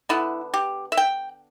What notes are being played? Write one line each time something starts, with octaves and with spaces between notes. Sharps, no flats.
D3 B3 E4
G4
E5
G5